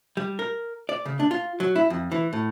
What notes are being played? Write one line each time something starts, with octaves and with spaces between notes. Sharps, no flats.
G3
A#4
D5
C#3
D4
F4
F#3
E4
F2
E3
A2